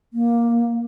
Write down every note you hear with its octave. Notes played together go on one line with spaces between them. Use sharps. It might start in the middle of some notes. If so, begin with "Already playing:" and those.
A#3